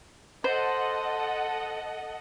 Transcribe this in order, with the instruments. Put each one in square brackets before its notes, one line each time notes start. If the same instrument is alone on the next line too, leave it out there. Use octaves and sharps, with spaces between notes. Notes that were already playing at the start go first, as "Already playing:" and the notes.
[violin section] A4 D#5 F#5 [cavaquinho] C5